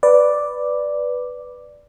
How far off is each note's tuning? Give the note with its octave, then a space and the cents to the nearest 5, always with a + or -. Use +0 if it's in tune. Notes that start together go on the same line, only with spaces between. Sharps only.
B4 +0 D5 +0